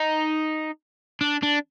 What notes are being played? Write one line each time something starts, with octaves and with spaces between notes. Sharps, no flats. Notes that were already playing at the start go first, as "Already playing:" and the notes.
Already playing: D#4
D4
D4